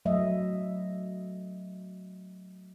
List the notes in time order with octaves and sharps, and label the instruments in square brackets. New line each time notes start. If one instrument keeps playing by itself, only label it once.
[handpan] F#3 A3 D#5 E5